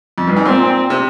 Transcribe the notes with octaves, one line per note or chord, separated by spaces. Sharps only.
F2
G2
G#2
A#2 C4
C3